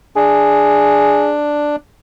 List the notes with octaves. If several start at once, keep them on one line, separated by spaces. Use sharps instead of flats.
D4 G#4